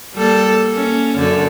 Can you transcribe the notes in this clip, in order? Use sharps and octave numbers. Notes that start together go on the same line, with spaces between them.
G3 A#3 A4
A#3 C#4
F#2 D3 A4